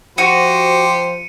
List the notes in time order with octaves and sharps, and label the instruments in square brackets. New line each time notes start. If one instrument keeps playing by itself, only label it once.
[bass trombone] F3 [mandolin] F#4 [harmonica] G4 C5 [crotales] C#7 D#7